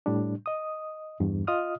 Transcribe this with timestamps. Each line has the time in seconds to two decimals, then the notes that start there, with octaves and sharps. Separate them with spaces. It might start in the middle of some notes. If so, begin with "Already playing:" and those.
0.06 A2 G3 D4
0.46 D#5 D#6
1.20 E2 G2
1.47 F4 D#5 D#6 F6